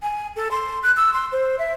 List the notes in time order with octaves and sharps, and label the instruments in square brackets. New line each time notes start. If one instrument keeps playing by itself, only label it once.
[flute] G#5
A4
C6
F#6
E6
C6
C5
E5